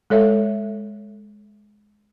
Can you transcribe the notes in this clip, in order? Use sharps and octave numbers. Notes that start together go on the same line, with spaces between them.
G#3 A4 C#5 E5